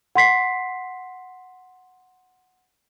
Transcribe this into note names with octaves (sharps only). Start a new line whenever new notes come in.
F#5 C6 B6 C7